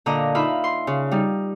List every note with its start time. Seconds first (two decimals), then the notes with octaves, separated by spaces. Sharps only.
0.06 A#2 D3 D#5 A#5
0.35 D#4 F4 E5 B5
0.64 C6
0.87 C#3
1.11 G3 D#4